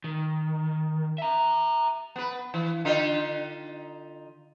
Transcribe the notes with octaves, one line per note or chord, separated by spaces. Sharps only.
D#3
E5 A#5
B3 B4
E3
D3 D#4 F4